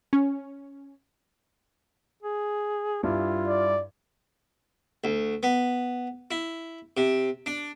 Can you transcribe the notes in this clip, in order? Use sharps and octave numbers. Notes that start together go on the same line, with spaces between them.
C#4
G#4
G2 E4 F4 G4
D5
D2
B3
E4
C3
D4